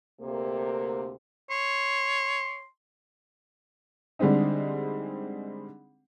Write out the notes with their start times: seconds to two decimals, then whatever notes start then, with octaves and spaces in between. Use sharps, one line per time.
0.21 D2 C3 A#3
1.50 C#5 C6
4.19 D3 G3 G#3 C4 D#4